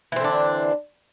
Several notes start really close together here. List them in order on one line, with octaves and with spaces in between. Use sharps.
E3 C4 D3 D4